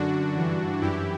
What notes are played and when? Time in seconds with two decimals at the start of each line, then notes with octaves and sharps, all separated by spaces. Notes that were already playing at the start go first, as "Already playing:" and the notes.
Already playing: F#2 D3 D4 F#4
0.37 G2 E3
0.81 F#2 E3 E4 G4